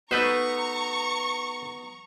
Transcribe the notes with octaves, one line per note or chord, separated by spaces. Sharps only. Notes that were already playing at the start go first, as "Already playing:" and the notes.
A3 B3 D#4 F#4 B4 C5 A#5 C#6